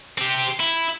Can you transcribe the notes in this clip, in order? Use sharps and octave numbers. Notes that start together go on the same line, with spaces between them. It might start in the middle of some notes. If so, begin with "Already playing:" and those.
C4 G4
E4